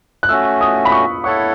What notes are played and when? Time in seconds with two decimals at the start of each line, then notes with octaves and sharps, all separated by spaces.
0.23 F#6
0.29 A3 C#4 F#4 E6
0.61 D#6
0.85 B5
0.92 C#6
1.24 E4 A4 C#5 F#5 C#6